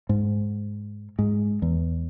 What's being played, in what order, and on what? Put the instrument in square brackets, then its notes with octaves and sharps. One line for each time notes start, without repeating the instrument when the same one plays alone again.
[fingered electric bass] G#2
G#2
E2